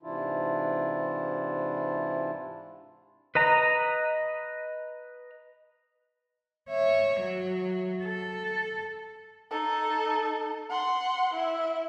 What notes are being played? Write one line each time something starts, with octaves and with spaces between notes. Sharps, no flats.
G#2 C3 E3 D4 E4 F4
B4 D#5 A#5
C#5 E5
F#3
A4
D#4 A4
F#5 C6
E4 E5